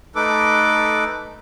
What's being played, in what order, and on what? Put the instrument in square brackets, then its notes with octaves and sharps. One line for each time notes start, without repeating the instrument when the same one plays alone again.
[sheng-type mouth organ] A3 D#4 A4 B4 D6